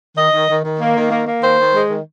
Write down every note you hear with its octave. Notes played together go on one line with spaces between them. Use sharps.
D#3 D#5
D#3
D#3
D#3
A#3
D#3
A#3
A#3
D#3 C5
D#3
G#3
D#3